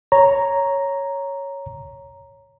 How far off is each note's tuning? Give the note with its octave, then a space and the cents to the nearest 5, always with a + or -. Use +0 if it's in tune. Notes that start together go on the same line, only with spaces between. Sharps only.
C#5 +0 A#5 +0